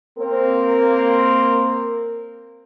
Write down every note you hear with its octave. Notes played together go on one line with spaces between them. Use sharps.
A#3 C4 A#4